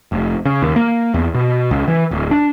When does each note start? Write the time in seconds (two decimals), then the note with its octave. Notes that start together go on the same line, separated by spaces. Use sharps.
0.12 F1
0.45 C#3
0.62 D#2
0.76 A#3
1.14 E2
1.34 B2
1.71 C#2
1.88 E3
2.11 D1
2.31 D4